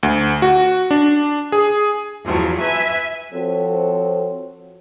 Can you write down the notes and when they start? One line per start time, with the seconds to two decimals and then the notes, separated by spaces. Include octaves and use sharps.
0.03 D2
0.42 F#4
0.91 D4
1.52 G#4
2.23 E2 F3 F#3
2.58 B4 E5 G#5
3.32 F3 C4 F#4 A4 C#5